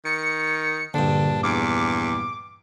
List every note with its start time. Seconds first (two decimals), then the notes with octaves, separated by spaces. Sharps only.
0.05 D#3 C#7
0.94 A#1 G2 D3 D4
1.43 E2 D6